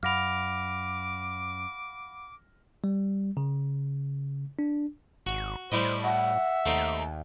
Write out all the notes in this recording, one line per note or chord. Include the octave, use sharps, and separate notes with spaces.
F#2 F5 F#5 B5 D6 F6 A#6 F7
G3
C#3
D4
G#1 F#4
A2 G3 E4 C5 D#5
E5 F#5
D#2 A3 C4 D#4